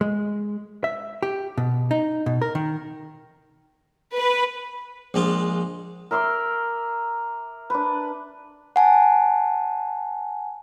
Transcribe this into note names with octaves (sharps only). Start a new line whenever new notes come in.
G#3
E5
G4
B2
D#4
B2
A#4
D#3
B4
A#1 G#3 F4
A#4 E5 C6 D6
D4 B4
F#5 G#5 A5